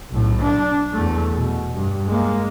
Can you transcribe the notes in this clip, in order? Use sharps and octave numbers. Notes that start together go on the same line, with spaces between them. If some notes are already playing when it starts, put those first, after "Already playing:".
B1 A2
D4
E2 A3
B2
G2
G#3 A#3